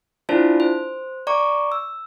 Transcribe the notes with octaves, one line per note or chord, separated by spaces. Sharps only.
D4 E4 F4 C5 D5 A5
C5
D5 A#5 C#6 D6
E6